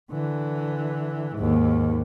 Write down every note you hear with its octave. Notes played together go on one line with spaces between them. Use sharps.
D3 E3
D#2 G#2